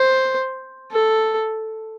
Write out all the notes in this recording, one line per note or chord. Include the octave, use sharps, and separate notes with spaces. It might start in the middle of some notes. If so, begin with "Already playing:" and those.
Already playing: C5
A4